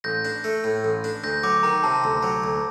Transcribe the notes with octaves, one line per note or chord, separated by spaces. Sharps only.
A1 G6 A#6
D4
A3
A2
A1
D4
D2 G6 A#6
F#3 D6
D#3 A#5
C3 A5
D2
F#3
D2